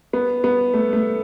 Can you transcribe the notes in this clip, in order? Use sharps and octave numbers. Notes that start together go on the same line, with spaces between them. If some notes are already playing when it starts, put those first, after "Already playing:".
B3
B3
A3
A3